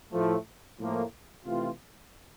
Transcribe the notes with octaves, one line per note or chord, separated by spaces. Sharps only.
A2 F3 A3
A2 F3 A#3
C3 E3 A3 C4 F4